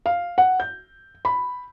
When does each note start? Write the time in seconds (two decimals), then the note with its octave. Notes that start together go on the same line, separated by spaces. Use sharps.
0.06 F5
0.38 F#5
0.60 G6
1.25 B5